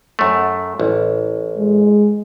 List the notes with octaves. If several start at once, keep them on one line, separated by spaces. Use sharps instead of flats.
F#2 A3
A1
G#3